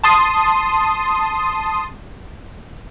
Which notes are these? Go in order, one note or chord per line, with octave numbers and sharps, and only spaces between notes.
A5 C6 D#6